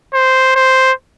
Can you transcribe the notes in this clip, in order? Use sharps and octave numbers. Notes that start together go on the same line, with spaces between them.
C5
C5